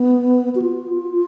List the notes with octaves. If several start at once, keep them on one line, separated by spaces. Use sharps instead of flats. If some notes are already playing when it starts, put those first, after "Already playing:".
Already playing: B3
F#4
F4